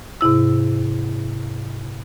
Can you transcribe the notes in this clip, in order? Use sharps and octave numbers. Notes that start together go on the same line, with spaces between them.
G#2 C3 E4 E6